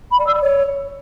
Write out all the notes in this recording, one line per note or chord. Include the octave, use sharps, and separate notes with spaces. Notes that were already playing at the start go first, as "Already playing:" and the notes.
B5
D5
E6
D5
C#5